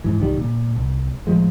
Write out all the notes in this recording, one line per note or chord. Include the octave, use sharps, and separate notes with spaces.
G#2 E3
C2 D#3 E3 G3
A#2
C2
A2 D#3 F3 G#3